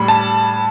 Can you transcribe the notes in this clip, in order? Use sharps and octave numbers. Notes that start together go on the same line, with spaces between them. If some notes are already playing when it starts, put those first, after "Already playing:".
Already playing: A2 G3 B5
A5